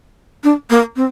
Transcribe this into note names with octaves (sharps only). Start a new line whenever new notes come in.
D4
A#3
C4